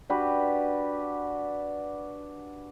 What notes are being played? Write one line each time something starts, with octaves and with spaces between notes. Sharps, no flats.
D4 F#4 G4 B4